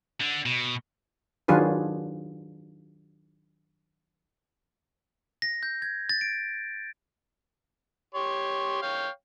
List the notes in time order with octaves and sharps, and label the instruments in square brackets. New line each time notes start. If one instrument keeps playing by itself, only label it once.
[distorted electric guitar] D3
B2
[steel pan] D#3 F#3 D4 F4 G#4 B4
[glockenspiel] A#6
G6
G#6
A6
D7
[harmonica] G4 C#5 C6
C#5 F5 G5